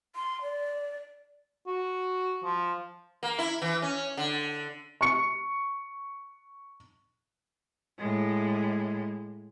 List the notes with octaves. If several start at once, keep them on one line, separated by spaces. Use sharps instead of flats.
C6
D5
F#4
F3
A#3
E4
E3
C#4
D3
C#6 C#7
A2 G#3